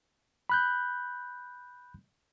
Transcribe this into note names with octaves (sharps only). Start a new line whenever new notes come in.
B5 F#6 G6